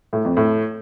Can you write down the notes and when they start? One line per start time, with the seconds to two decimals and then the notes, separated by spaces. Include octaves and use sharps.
0.13 A2
0.25 F2
0.37 A2